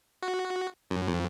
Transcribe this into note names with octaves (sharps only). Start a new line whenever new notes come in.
F#4
F#2
F2